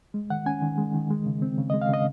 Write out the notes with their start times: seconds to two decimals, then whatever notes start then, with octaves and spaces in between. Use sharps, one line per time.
0.14 G#3
0.30 D#3 F#5
0.46 C#4 G#5
0.62 D#3
0.77 G#3
0.94 D#3
1.10 G#3
1.26 C#3
1.42 C4
1.58 C#3
1.70 D#5
1.74 G#3
1.81 F5
1.89 C#3 D#5